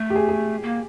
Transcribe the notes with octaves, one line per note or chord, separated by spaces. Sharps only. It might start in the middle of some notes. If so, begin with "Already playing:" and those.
Already playing: A3
G4
G#4
G#4
A#3